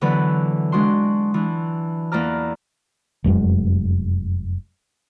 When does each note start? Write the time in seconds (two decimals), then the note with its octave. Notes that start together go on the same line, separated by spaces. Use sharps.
0.01 D3 E3 F#3 B3 B4 D5
0.72 G#3 D4 F#4 C6
1.34 E3 D4
2.12 E2 A#3 B4 D5 A#5 F6
3.24 F1 F#2 A2 G#3